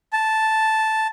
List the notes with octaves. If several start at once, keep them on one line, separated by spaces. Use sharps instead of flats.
A5